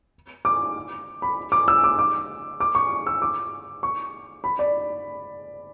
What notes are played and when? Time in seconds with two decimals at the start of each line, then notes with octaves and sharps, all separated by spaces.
0.45 D6
1.22 B5
1.52 D6
1.68 E6
1.84 D6
1.99 D6
2.60 D6
2.75 C#6
3.06 E6
3.22 D6
3.83 C#6
4.44 B5
4.59 D5